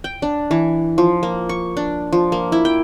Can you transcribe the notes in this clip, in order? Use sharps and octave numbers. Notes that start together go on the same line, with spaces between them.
G5
D4
E3
F3
A#3
C#6
D4
F3
A#3
E4
G5